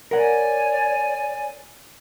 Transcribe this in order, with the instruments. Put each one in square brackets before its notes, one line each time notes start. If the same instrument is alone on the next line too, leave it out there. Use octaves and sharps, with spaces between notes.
[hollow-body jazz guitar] A#4 F#5 [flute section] C#5 D5 G#5